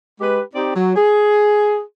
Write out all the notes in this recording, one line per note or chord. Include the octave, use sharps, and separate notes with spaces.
G#3 G4 B4
C4 D#4 G4 D5
F#3
G#4